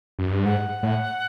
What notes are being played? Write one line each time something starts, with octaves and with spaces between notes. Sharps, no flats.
F#2
G2
G#2 F#5
A2